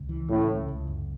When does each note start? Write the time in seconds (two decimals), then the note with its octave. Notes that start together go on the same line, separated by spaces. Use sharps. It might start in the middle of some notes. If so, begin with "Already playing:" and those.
Already playing: C#2
0.09 E3
0.28 A2 C#3
0.49 C#2
0.68 C#2
0.87 F#1